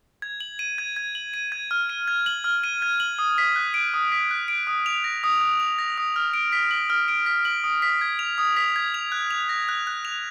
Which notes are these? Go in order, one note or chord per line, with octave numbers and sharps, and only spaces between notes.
G#6
F#7
D#7
G#6
G#6
F#7
D#7
G#6
F6
D#7
G#6
F#7
F6
D#7
G#6
F#7
D#6
B6
F#6
D7
D#6
B6
F#6
D7
D#6
F7
A#6
D#6
D#6
F7
A#6
D#6
F6
D7
B6
F#7
F6
D7
B6
F#7
D#6
B6
G#6
F7
D#6
B6
G#6
F7
F#6
F7
A#6
F#6
F#6
F7